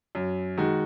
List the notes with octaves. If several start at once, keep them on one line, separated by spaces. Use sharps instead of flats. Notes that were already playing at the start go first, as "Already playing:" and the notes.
F#2
D#3 G#3 F#4